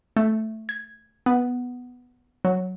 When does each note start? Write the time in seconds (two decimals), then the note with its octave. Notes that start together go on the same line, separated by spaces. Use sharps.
0.16 A3
0.69 G#6
1.26 B3
2.45 F#3